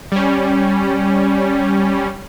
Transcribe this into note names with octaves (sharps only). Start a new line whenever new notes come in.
G3 C#4